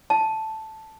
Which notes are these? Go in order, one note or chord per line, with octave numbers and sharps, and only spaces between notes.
A5